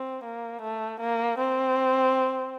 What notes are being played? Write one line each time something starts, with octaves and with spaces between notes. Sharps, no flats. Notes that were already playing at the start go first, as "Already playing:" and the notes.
Already playing: C4
A#3
A3
A#3
C4